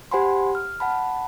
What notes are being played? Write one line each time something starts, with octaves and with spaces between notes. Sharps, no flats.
G4 C5 F#5 G#5 B5 C6
F6
F#5 A5 B5